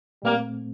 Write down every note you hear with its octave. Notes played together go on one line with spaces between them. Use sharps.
A#2 G3 A3 A#3 C4